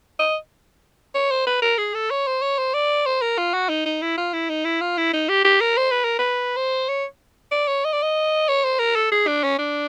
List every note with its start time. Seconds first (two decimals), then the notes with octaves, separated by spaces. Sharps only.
0.19 D#5
1.15 C#5
1.31 C5
1.47 B4
1.62 A#4
1.78 G#4
1.95 A4
2.11 C#5
2.27 C5
2.42 C#5
2.59 C5
2.74 D5
3.06 C5
3.22 A#4
3.38 F4
3.54 F#4
3.69 D#4
3.86 D#4
4.02 E4
4.17 F4
4.34 E4
4.50 D#4
4.65 E4
4.81 F4
4.98 E4
5.13 D#4
5.29 G4
5.45 G4
5.61 A#4
5.77 C5
5.91 B4
6.05 A#4
6.19 B4
6.57 C5
6.89 C#5
7.52 D5
7.68 C#5
7.85 D#5
7.93 D5
8.02 D#5
8.48 C#5
8.64 C5
8.79 A#4
8.96 A4
9.12 G#4
9.27 D4
9.44 C#4
9.59 D4